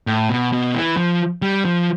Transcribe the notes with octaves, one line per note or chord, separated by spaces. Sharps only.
A2
B2
B2
E3
F3
G3
F3